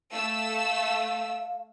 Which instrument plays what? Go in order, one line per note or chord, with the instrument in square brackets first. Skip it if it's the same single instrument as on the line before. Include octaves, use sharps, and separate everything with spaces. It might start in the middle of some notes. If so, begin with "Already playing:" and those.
[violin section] A3 E6 [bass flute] F5